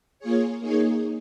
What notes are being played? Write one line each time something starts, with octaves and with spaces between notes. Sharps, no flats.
A#3 F4 G#4 C#5
A#3 D#4 G#4 C#5